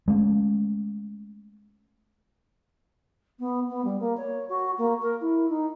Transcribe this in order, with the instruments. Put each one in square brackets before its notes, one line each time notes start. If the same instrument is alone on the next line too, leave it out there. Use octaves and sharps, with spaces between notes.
[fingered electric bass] G#3 A3 C#4
[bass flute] B3
B3
G3
A#3
C#5
F#4
A#3
A#4
E4
D#4